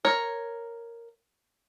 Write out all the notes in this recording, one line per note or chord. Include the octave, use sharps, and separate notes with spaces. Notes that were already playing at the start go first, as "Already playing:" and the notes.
A#4 C#5